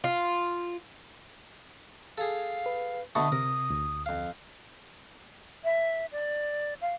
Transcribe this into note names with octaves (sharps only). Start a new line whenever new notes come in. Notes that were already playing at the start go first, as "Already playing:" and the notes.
F4
G#4 A4 F5
B4
B2 D3 A3 A5 B5 C#6 D#6
C3 A#4
D2
F2 F5
E5
D5
F5